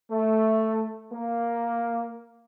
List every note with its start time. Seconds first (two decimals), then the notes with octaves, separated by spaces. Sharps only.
0.10 A3
1.12 A#3